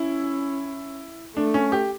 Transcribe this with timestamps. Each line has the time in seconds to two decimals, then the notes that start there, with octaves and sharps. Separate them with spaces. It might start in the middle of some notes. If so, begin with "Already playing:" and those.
Already playing: C#4 E4
1.36 A3 D4
1.54 C#4
1.72 G4